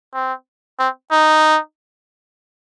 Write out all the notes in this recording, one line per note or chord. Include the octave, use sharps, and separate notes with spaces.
C4
C4
D#4